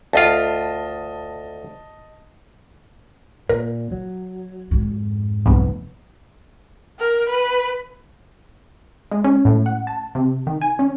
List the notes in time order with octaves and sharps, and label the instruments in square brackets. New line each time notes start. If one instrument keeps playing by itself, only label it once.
[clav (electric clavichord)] D2 F4 [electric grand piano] D#5 A5
[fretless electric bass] A#2 [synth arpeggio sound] A#4
[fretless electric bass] F#3
[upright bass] F2 G#2
[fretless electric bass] F1 B3 [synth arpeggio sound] C2 G#2
[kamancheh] A#4
B4
[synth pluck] G#3
C#4
A2
F#5
A5
C3
D#3
G#5
C#4